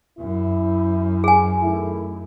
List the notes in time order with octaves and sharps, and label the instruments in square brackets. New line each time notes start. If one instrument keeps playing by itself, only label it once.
[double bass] F#2 [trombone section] E4
[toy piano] G#4 G#5
[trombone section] D#3 A3 E4